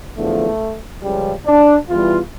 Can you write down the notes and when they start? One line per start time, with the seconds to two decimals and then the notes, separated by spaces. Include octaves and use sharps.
0.17 E2 D3 F3 A3
1.03 C#2 C#3 F3 G3
1.46 D4
1.88 E2 E3 G3 F4